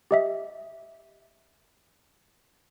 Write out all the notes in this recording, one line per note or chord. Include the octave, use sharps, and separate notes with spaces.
G4 D#5 E5